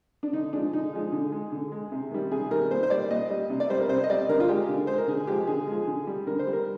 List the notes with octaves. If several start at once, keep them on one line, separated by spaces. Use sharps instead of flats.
D4
D3 D#4
F3 G#3 D4
D3 D#4
F3 G#3
D3
G#3
D3
G#3
C3
D#3 G3
C3 G#4
D#3 G3 A#4
A#2 C5
C5
G3 D5
A#2 D#5
G3
C3
D5
G3 C5
A#4
C3 C5
D#5
G3 D5
D3 A#4
F4
G#3 G4
D3
G#3 C5
A#4
D3 G#4
F3 G#3 G4
D3 G#4
F3 G#3
D3
G3
D3 A#4
C5
G3
A#4